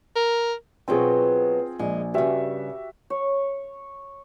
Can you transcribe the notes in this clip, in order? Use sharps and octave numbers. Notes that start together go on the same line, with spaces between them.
A#4
B2 F#3 B3 C4 F4 G#4
A#1 G#3
G2 C#3 F#4 G4 E5
C#5